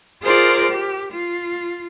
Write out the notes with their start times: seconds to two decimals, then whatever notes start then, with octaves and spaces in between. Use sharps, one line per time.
0.23 F4 G#4 A#4 C5 D5
0.69 G4
1.12 F4